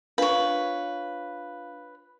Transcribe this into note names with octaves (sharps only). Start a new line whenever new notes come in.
D4 F4 B4 C#5 F5